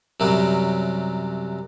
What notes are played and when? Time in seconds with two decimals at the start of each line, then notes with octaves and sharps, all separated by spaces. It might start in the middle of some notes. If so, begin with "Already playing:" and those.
0.20 F#2 C3 F#3 G3